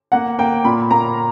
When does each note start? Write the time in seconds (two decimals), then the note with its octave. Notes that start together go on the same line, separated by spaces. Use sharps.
0.12 A#3 F#5
0.39 A#3 G5
0.65 A#2 B5
0.91 A#3 A#5